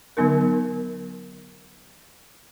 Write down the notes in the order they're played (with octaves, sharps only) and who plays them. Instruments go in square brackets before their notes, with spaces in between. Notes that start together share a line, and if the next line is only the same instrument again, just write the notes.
[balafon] D3 F#3 B3 D#4 A#4